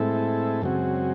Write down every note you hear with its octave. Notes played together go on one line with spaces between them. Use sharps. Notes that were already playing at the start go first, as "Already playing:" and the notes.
Already playing: A2 G#3 C4 E4 A4
F#2 C#3 G#3 C4 F#4